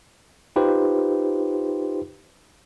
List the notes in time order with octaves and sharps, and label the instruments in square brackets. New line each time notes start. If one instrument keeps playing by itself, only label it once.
[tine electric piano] D#4 F4 G4 B4 C5